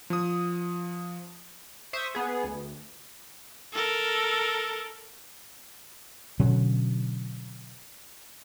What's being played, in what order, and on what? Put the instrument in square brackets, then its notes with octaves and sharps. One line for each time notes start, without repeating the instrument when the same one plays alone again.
[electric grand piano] F3 D#6
[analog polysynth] C5 E5 C#6 D#6
B3 G#4
D2
[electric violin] A4 A#4
[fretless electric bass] B2 D3 F#3 C#4